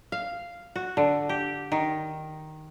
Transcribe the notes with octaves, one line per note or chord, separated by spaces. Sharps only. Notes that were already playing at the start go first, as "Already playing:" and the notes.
F5
F#4
D3
G4
D#3